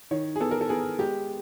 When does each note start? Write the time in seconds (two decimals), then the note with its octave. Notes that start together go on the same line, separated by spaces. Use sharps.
0.11 D#3 C#5
0.36 G#4
0.40 B3 A4
0.51 A#4
0.61 A4
0.69 B3 G#4
0.99 G#3 G4